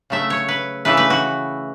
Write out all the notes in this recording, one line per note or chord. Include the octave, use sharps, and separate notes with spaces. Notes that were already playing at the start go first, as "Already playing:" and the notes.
C#3 F#3 A3 E5
C#5
B4
C#3 E3 A3 E4 B4
B4
F#4